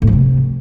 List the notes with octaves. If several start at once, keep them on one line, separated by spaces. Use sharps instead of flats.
A2
F3
C3